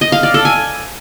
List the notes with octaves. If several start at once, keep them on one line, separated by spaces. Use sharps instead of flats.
D#5
F5
D5
A4
G#5